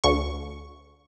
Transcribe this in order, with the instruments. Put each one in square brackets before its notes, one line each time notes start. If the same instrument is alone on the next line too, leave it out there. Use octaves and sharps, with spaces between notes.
[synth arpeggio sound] D2 C#6